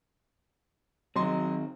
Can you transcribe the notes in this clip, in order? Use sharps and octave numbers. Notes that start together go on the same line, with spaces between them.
D#3 F#3 C4 D#5 C6